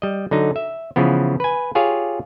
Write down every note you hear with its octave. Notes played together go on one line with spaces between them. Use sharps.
G3 D#5
D3 F#3 D#4
E5
C#3 E3 F3 B3
B4 G#5
F4 G4 G#4 C#5 F5